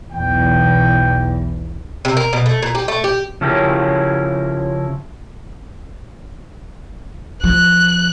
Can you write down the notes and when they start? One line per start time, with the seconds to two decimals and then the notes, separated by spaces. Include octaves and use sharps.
0.13 B1 E2 G5
2.05 C3
2.17 A#4
2.33 B2
2.46 A3
2.62 A#2
2.75 G4
2.88 A3
3.04 G4
3.41 C#3 F3 C#4 E4 G4 A#4
7.44 F3 F#6